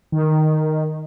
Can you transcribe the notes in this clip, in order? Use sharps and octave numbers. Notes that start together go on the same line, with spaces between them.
D#3